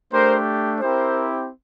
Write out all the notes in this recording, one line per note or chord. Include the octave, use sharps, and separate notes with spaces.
A3 D4 G4 A#4 C5
C4 E4 G4 A#4 C5